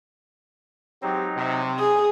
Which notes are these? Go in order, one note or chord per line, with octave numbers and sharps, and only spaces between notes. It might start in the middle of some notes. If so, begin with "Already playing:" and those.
F#3 G#3 C4 D#4 G4
C3
G#4 D#6